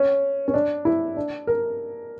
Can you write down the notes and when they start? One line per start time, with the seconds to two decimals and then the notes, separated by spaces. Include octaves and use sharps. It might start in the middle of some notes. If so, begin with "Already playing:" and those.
Already playing: C#4
0.48 C#4
0.54 D4
0.85 E4
1.16 D4
1.47 A#4